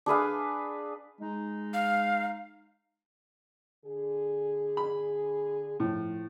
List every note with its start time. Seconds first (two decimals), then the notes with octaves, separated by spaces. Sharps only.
0.06 D4 G#4 B4 F5
1.19 G#3 D#4
1.74 F5
3.85 D3 G#4
4.77 B5
5.80 A2 F3